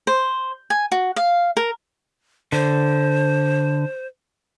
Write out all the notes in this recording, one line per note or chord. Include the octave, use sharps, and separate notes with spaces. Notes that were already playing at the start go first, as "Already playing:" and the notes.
C5
G#5
F#4
F5
A#4
D3 C5